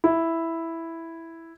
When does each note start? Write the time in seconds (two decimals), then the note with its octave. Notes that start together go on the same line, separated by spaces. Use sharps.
0.04 E4